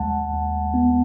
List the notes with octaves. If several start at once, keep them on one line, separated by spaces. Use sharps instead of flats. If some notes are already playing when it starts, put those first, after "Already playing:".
Already playing: D#2 G#3 F#5 A5
D#2
B3